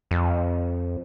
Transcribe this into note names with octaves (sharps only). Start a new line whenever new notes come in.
F2